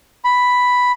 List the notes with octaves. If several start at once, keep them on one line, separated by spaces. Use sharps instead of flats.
B5